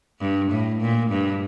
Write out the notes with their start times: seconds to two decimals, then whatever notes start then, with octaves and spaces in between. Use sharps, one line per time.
0.21 G2
0.51 A2
0.81 A#2
1.10 G2